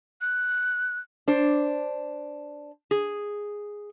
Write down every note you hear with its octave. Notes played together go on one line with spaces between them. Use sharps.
F#6
D4 C5
G#4